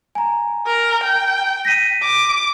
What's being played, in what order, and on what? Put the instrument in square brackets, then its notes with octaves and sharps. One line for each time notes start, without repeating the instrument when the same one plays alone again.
[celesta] G#5 A#5
[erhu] A#4
G5
[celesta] A#6 B6 D#7
[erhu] D6